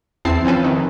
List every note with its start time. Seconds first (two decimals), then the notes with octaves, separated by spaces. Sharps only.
0.25 E2 C4 E4 A5 C7
0.45 F3 C4 C#4 A4 B4
0.63 C3 D#3 E3